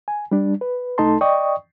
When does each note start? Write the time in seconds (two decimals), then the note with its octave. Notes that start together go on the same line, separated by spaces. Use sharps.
0.08 G#5
0.31 G3 D4
0.61 B4
0.98 C2 A3 D#4 A4 A5 C6
1.21 D5 D#5 G5 C#6 D#6